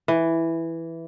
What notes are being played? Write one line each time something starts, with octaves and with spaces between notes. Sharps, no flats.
E3